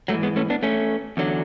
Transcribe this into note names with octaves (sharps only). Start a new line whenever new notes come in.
G#2 F#3 A3
E3
G#3 B3
A3 C#4
B3 D4
A3 C#4
E2 D3 F#3